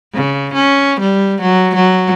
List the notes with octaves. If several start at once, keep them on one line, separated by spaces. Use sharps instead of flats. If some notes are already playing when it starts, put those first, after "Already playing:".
C#3
C#4
G3
F#3
F#3